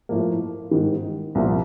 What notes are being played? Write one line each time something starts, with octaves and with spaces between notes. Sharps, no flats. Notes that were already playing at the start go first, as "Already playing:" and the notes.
A2 F3 A#3
G#2 D#3 G3
C2 A#2 F3